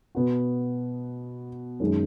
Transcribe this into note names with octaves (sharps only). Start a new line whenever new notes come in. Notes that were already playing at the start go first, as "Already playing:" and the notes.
B2 B3 F#4
F#2 D#3 G#3